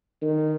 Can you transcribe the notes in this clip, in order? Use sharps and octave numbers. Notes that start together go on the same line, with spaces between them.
D#3